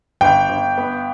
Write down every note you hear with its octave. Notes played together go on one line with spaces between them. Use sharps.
G1 G5
G1
B3